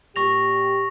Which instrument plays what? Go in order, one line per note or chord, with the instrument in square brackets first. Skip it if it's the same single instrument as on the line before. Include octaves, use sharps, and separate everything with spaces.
[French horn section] A#2 G4 [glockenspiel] C#6 A#6 F7